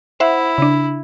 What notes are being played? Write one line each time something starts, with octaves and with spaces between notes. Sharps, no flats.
E4 C5 E5 F#5
C#3 D4